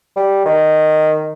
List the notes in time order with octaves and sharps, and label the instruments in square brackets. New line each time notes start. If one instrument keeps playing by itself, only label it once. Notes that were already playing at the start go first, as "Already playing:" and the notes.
[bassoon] G3
D#3